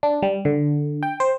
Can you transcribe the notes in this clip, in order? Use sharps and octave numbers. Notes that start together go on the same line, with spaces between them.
D4
G3
D3
G5
C5